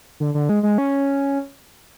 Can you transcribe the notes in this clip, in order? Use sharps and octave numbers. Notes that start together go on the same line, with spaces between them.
D3
D3
G#3
G#3
C#4